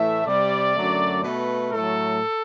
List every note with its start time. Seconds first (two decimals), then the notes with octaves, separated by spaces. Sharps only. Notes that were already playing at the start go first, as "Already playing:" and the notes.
Already playing: A2 E3 A3 E5
0.25 C3 G3 D5
0.74 F#2 D3 F#3 A3
1.23 B2 A3 B4
1.71 A2 F#3 A3 A4